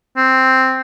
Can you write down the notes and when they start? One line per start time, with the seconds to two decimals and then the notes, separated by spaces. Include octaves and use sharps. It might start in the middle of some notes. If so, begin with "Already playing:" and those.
0.17 C4